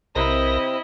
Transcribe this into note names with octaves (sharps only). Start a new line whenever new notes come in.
B1 C3 C4 E4 A#4 B4 D#5 A#5